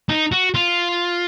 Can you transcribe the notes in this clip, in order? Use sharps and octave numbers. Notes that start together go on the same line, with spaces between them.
D#4
F#4
F4